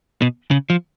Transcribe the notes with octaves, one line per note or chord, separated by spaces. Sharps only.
B2
C#3
F3